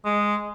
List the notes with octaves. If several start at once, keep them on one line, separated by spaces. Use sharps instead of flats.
G#3